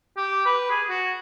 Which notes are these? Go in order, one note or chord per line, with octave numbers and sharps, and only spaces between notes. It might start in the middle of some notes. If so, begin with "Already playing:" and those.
G4
B4
G#4
F#4